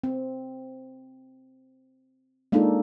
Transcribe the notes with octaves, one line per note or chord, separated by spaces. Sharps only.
C4
G#3 A#3 D4 D#4 F4 A4